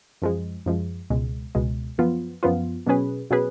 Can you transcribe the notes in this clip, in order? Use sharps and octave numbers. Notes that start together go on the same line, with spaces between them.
F#2 F3 G#3
F#2 F3 G#3
C#2 B2 G#3
C#2 B2 G#3
F#2 F3 B3 F4
F#2 F3 B3 F4
B2 F#3 C#4 G#4 B4
B2 F#3 C#4 G#4 B4